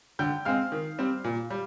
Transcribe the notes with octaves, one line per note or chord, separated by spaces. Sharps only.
D3 G5 G6
G#3 C4 F5 F6
D#3
G3 C4
A#2
G3